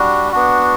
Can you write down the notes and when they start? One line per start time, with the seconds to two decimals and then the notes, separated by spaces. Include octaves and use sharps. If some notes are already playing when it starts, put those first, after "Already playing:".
Already playing: G3 D4 F#4
0.32 B3 D4 F#4